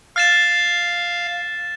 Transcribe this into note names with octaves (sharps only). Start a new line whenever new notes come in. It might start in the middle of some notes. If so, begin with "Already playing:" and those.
F5 F6 A6 E7